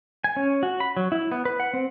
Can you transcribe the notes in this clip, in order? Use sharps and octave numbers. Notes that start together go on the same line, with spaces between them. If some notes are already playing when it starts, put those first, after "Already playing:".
G#5
C#4
F#4
B5
F#3
E4
B3
B4
F#5
C4